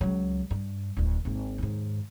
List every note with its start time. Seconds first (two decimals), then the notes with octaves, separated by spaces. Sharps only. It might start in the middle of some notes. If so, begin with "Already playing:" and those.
0.01 C#2 F#3
0.50 G2
0.97 D1 D2
1.25 G#1 A#3
1.58 D#2 G#2